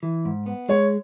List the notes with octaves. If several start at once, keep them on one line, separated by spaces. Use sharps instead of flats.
E3
G#2
B3
G#3 C#5